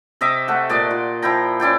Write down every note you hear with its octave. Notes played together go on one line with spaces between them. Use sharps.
C3 D#5 E5 D6
A3 F#5
A#2 D5 D#5 D6
F4
F3 E4 G5 A#5
C#4 E4 D5 G5